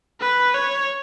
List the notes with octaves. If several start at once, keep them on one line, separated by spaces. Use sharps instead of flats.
B4
C#5